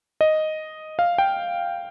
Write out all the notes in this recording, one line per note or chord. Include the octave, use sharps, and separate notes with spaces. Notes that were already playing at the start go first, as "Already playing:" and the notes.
D#5
F5
G5